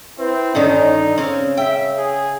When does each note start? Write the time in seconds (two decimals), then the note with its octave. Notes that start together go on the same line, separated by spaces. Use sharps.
0.19 C4 E4 B4
0.55 G2 D3 D#3 C#4 D#4
1.18 C#3 C4 C#4
1.57 E5 G5
1.98 G#4